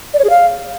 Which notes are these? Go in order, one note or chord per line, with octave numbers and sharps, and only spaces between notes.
D5
C#5
G#4
F5